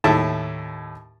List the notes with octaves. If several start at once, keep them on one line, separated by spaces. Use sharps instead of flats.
D#2 A2 E5 A5